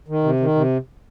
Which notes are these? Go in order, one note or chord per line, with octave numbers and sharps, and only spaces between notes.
D#3
C3
D#3
C3